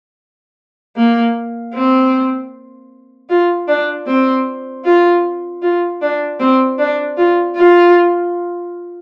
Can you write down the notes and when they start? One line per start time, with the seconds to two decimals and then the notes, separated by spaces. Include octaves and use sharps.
0.96 A#3
1.74 C4
3.30 F4
3.68 D4
4.07 C4
4.85 F4
5.62 F4
6.01 D4
6.40 C4
6.79 D4
7.17 F4
7.56 F4